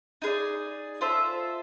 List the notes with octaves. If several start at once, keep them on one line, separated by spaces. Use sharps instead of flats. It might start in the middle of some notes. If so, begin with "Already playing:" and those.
D#4 G#4 B4 D5
F4 A4 C5 E5